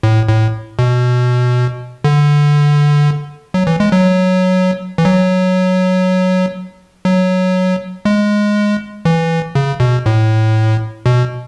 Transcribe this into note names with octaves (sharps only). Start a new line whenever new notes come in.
A2
A2
B2
D3
F#3
E3
G#3
F#3
E3
F#3
F#3
G#3
E3
C#3
B2
A2
B2